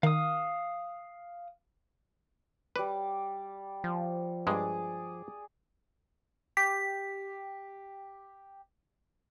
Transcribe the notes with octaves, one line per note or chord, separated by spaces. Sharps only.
D#3 F5 D#6
G3 B4 D5
F3
G2 G#3 G#4 D5
G4 B6